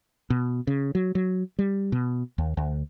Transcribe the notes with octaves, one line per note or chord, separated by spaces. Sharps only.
B2
C#3
F#3
F#3
G3
B2
D#2
D2